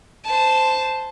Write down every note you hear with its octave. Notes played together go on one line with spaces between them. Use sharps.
C5 A5